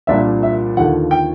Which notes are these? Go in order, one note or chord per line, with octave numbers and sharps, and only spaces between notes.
C2 A#2 F3 A#3 D4 E5
E5
D#2 D3 F3 F#5
G5